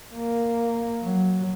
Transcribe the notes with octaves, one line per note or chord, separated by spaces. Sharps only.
A#3
F#3